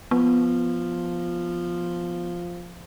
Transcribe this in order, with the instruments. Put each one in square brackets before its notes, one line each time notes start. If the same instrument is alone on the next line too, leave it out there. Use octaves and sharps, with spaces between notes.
[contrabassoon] F3 [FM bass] B3